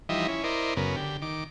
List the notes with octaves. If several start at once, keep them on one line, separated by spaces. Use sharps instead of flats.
E3 F3 G3 D#4 D#5 E5
C#4 E4
E4 A#4 C5 D5 D#5
F#2 C#3 B3 A#4
D3 G4
D#3 D6